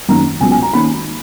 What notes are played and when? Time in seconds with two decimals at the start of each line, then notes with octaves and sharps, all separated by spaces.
0.08 F#2 D#3 F#3 A#3 C#4 A#5
0.41 C#2 C#3 F#3 B3 G#5
0.51 G#5
0.62 A#5
0.73 D#3 A#3 C#4 B5